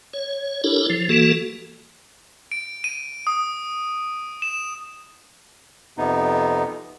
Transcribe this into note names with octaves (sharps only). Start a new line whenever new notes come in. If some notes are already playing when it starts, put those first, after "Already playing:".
C#5
D4 E4 G4 A4 A#4 C#5
F3
E3 A#3 F#4 A4
D7
D#7
D#6
E7
F2 C3 B3 D#4